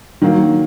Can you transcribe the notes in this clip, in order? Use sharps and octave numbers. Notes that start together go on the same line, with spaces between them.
D#3 F#3 A#3